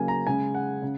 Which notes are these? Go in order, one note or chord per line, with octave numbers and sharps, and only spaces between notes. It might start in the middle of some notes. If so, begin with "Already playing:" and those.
Already playing: C#3 F#3 A#3 G#5
A#5
C#3 G#3 G#5
F#5
C#3